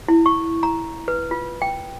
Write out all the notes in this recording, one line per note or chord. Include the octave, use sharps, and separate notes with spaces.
E4
C#6
A#5
B4
F4
G5